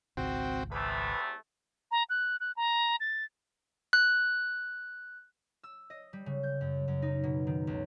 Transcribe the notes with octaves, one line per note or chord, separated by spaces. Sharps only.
G#1 C#2 C4 F#4 G5
E2 C3 A3 B4
A#5
F#6
F#6
A#5
A6
F#6
E6
D#5
G3
C#3
G6
F#2
F#2
D#4
B2
D#3
C#2